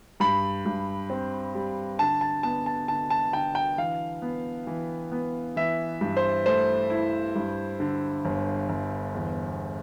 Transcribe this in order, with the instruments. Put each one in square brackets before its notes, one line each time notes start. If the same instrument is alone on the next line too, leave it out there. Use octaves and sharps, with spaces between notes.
[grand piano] G2 B5
G2
C4
G3
D3 A5
A5
B3 A5
A5
D3 A5
A5
D3 G5
G5
E3 F5
B3
E3
B3
E3 E5
G2
C5
A3 C5
E4
G2
D3
G1
G1
E2